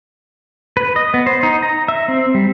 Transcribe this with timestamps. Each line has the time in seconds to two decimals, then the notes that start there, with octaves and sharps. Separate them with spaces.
0.77 B4
0.96 D#5
1.14 B3
1.26 C5
1.43 D#4
1.63 A#5
1.88 E5
2.08 C4
2.34 G3